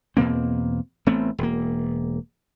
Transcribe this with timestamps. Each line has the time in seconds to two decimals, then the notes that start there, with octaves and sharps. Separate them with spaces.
0.17 E2 B2 A#3 C4
1.07 A1 A3 B3 C4
1.38 E1 A#3